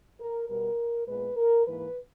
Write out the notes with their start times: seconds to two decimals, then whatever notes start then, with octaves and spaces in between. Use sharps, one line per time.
0.20 A#4
0.49 B2 G3 B3 A#4
1.08 A#2 G#3 B3 B4
1.37 A#4
1.66 G#2 E3 A#3 B4